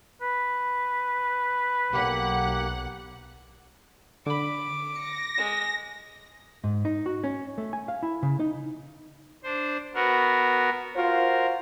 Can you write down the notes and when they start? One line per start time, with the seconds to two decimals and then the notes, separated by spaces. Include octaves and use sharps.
0.21 B4
1.93 B1 A#3 G4 F#5 F#6
4.26 D3 B5 D6
4.95 A#6 C#7
5.38 G#3
6.64 G#2
6.85 D#4
7.06 F#4
7.24 C#4
7.58 A3
7.73 G#5
7.88 F5
8.03 E4
8.23 C#3
8.40 D#4
9.44 D4 C5
9.95 B3 F#4 A#4
10.96 F4 F#4 A#4 C5